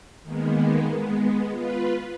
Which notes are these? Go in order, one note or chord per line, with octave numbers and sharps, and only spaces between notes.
D#3 G#3 A#3 B3
G#3 B3
F4 B4